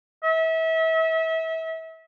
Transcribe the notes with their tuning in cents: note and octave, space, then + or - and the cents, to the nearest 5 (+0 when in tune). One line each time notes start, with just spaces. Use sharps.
E5 -30